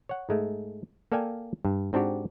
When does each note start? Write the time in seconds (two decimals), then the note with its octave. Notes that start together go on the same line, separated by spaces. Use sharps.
0.09 C#5 F#5
0.29 G#2 G#3 A3
1.12 A#3 A4 D5 F5 G5 G#5
1.65 G2
1.93 G#2 C4 D4 F#4 G4